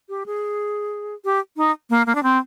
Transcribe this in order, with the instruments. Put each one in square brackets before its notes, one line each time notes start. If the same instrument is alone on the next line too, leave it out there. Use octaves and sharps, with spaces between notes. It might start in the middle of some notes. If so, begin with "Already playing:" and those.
[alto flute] G4
G#4
G4
D#4
A#3
A#3
D4
C4